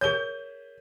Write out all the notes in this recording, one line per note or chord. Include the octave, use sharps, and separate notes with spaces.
G#4 A#4 C#5 G6 G7